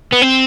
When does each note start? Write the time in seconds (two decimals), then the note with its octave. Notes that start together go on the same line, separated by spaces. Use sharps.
0.13 B3
0.22 C4